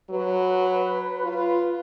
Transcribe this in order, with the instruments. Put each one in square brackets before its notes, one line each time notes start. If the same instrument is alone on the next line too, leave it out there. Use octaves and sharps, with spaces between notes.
[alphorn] F#3 [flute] B4
[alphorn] F4